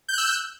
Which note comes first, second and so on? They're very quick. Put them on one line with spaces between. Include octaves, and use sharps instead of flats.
G6 F#6 E6